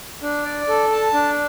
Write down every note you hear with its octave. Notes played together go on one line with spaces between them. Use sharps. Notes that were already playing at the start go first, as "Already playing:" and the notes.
D4
D5
A4
A5
D4